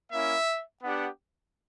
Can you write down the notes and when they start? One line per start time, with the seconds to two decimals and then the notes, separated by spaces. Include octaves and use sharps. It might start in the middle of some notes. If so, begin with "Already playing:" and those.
0.12 A#3 C#4 E4 E5
0.83 B3 D4 G4 F#5